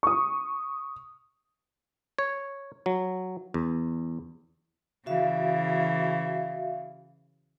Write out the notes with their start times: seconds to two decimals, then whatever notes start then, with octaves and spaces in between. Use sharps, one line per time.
0.03 C#6 D#6
2.19 C#5
2.86 F#3
3.54 E2
5.06 C#3 E3 F#4 E5 F5